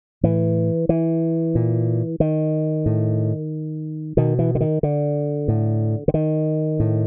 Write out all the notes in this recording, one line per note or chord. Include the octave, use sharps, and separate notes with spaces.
A2 E3
E3
A#2
D#3
A2
B2 D#3
E3
D3
D#3
D3
A2
D3
D#3
A2